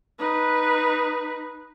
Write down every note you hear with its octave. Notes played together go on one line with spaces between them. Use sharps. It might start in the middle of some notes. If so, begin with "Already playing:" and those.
D#4 B4